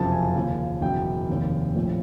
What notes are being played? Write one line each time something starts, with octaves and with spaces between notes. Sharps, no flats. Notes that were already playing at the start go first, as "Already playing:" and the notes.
Already playing: F#1 F2 C3 F3 A5
G#5
D#2 C#3 F3
F#1 E2 B2 G5
F1 D#2 D#3
A#1 A2 F3